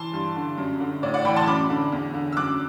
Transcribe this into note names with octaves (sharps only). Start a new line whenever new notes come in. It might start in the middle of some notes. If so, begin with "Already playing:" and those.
Already playing: E3 A5 C6
G2
D3
F#2
D3
A2 D5
D5 F#5
E3 G5 B5
A5 C6
F#2 B5 D6
D3
E2
D3
E6
F#2 D6 F#6